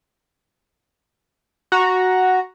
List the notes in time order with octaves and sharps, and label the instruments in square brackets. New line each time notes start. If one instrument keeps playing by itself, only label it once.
[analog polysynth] F#4 A#5